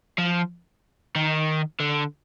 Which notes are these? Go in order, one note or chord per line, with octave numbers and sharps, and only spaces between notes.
F3
D#3
D3